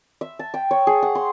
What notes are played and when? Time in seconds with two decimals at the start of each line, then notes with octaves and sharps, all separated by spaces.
0.21 E5
0.39 A5
0.54 G5
0.71 C#5
0.87 G#4
1.02 F#5
1.15 C6